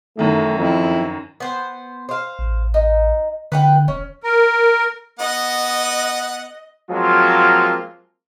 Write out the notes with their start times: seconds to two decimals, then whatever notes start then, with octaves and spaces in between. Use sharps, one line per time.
0.17 F#2 D#3 E3 A3
0.58 F2 E4
1.40 B3 C5
2.09 C5 F5
2.39 A1
2.74 D#4
3.52 D3 B4 F#5 G5
3.88 E1 C#4
4.23 A#4
5.19 B3 D#5 F#5
6.91 F3 F#3 G#3 A#3 C4 F4